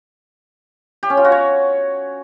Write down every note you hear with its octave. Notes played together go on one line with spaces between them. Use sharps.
G4
C#4
F4
F#4
C#5